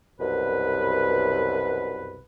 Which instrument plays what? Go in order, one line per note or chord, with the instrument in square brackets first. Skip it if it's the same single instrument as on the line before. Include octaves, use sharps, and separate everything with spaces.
[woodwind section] C2 F#2 B2 B4